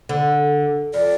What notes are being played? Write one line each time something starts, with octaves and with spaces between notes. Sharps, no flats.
D3
F2 D5